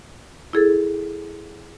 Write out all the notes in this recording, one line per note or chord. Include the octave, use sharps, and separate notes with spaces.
E4 G#4 A4